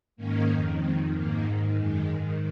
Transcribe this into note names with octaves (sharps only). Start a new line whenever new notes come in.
G#2 D#3 A#3 C#4
F2 D#3
F2 D#3 G#3 C4
G#2 D#3 A#3
G#2 D#3
F#2 D#3 G#3
G#2 D#3